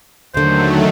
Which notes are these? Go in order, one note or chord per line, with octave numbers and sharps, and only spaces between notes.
D#2 D3 D#3 F#3 A3 C5